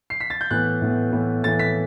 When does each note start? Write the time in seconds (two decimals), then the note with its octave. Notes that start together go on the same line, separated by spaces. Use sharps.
0.10 C7
0.20 B6
0.30 A6
0.41 G6
0.51 A2 E3 B3 F#6
0.82 A2 E3 B3
1.12 A2 E3 B3
1.43 A2 E3 B3 A6
1.59 B6